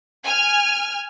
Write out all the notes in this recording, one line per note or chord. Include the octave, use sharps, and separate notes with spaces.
G#5 F6